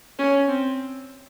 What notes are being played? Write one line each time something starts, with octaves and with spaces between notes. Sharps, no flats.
C#4
C4